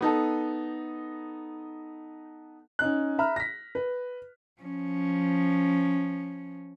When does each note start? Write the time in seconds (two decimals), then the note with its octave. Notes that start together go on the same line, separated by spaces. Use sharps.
0.01 B3 D#4 A4
2.79 C#4 D#4 F#6
3.19 E5 A#5 B5 F6
3.36 A#6 B6
3.75 B4
4.62 F3 C#4